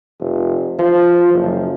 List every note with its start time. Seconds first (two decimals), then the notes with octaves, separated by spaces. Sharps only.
0.20 F1
0.79 F3
1.34 F#1